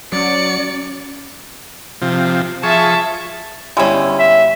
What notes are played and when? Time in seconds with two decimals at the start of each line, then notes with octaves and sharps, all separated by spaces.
0.13 F#3 C#4 D5 C#7
2.02 C3 F3
2.63 F3 G#4 E5 A5 C#6
3.77 G1 G3 G#3 C#4 E4
4.19 E5